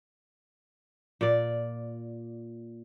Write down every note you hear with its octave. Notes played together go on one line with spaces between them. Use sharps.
A#2 D5